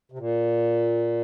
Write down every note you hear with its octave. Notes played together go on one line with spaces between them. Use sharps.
C3
A#2